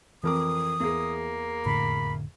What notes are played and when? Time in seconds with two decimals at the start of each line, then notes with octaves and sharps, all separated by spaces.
0.24 F2 E3 A#4 D6 D#6
0.80 E2 A#3 G#4
1.66 F1 A2 D3 B5